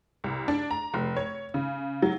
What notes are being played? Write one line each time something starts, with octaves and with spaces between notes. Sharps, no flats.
C2
D4
A#5
F1
C#5
C#3
F#3